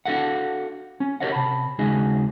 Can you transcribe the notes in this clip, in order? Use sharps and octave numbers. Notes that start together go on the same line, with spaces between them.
D4 F#4 A4 F5 F#5
C#4
F#4 G4 A#4 C#5 D#5 F#5
C3 A5 B5
D#2 C#3 G#3 D#4 F#4 G#4